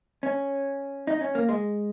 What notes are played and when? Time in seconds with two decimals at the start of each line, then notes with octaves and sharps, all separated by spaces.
0.23 C#4
1.07 D#4
1.21 C#4
1.35 A#3
1.49 G#3